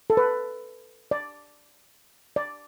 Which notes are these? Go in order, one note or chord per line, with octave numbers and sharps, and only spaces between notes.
A4
B4
D5
D5